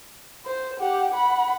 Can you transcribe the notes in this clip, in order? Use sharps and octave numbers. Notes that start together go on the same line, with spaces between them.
C5
G4 F#5
F#5 B5